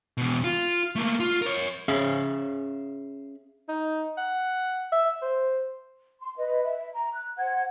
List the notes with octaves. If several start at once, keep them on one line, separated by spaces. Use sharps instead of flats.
E2 B2
F4
A3 A#3
F4
A#4 C#5
C#4 G#4 E5 F5
D#4
F#5
E5
C5
C6
B4 D#5
E5
A#5
F#6
C5 F#5 G#6